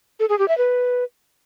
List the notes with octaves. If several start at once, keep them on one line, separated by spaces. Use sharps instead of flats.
A4
G#4
G4
E5
B4